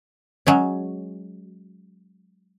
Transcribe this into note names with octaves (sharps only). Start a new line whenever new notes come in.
F#3 G#3 C#4